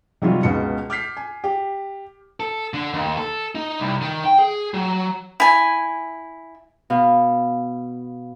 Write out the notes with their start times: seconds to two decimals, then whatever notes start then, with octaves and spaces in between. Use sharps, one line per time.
0.22 C3 D#3 F#3 G3 F4 G4
0.43 C#2 B2 G#3 C#7
0.90 D6 F6 G6 B6 C7
1.17 G#5
1.44 G4
2.40 A4
2.74 D3
2.94 D#2
3.17 A4
3.55 D#4
3.80 C2
4.01 D#3
4.24 G5
4.39 G#4
4.74 F#3
5.40 E4 G#5
6.90 B2 F5